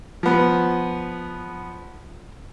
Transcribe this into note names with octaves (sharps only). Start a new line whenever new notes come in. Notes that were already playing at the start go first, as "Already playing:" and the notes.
F3 B3